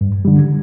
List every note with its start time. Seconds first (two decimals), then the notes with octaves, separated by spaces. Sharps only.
0.01 G2
0.25 D3 G3